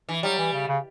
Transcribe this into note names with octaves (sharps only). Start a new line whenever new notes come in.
E3
F#3 G3
E3
C#3
C#3